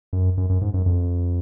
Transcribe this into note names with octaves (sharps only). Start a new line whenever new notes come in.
F#2
F#2
F#2
G#2
F#2
F2